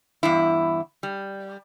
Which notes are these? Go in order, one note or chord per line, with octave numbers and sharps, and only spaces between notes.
E2 G2 E4
G3